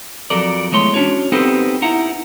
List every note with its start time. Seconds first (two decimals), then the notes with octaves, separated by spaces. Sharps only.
0.30 F2 F#3 A4 A#4 D5
0.72 E2 G#3 A3 C#5 C6
0.94 C#4 D4 F#4 C#5
1.32 B3 C4 D#4 G4 A4 C5
1.82 D#4 E4 F#5 A#5